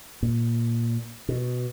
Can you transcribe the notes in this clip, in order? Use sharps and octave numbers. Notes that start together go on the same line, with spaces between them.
A#2
B2